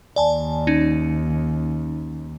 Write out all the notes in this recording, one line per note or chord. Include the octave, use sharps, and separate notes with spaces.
D#2 D5 G#5 A5
C#4 D#4